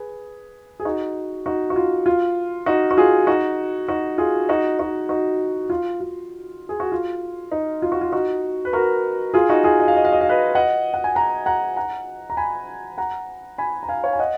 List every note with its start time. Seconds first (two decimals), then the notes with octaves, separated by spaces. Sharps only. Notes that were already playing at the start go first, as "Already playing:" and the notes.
Already playing: G#4 B4
0.80 G#4
0.85 D#4 F#4
1.46 D#4 F#4
1.70 F#4
1.76 F4
2.06 F4
2.66 D#4 F#4
2.91 F#4
2.97 F4 G#4
3.27 D#4 F#4
3.88 D#4 F#4
4.18 F4 G#4
4.49 D#4 F#4
4.79 D#4 F#4
5.09 D#4 F#4
5.70 F4
6.00 F4
6.69 G#4
6.80 F#4
6.92 F4
7.51 D#4
7.82 F4
7.92 F#4
8.01 F4
8.12 D#4 F#4
8.65 B4
8.73 F#4 A#4
9.34 F4 G#4
9.49 D#4 F#4
9.64 F4 G#4
9.80 D#5
9.88 F5
9.97 D#5
10.05 F5
10.12 D#5
10.21 F5
10.29 B4 D#5
10.55 D#5 F#5
10.94 F#5
11.04 G#5
11.15 F#5 A#5
11.46 F#5 A#5
11.77 F#5 A#5
12.30 A#5
12.37 G#5 B5
12.98 F#5 A#5
13.58 G#5 B5
13.83 A#5
13.88 F5 G#5
14.04 C#5 F5
14.13 G#5
14.19 D#5 F#5